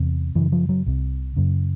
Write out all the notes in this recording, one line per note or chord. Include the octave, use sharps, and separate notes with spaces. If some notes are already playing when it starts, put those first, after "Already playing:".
Already playing: E2 C3
F#2 C#3 E3
F3
F#3
C2 C3
F#2 C#3